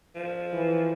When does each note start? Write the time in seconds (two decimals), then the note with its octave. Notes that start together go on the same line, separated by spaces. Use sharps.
0.15 F3
0.53 E3